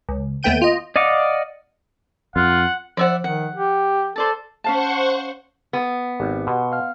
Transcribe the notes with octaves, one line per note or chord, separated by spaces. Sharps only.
C#2
D#2 A3 B3 G5 G6 D#7
F4 D#5
D5 D#5 F5 F#5 D6
F2 F4 F#5
F3 C5 D5 E5 F#5
D#3 F#5
G4
A4 C5 D5 A5
C#4 C5 F5 F#5 A5 C#6
B3
G#1 G4 B4
B2 F#5 C6
F5 F6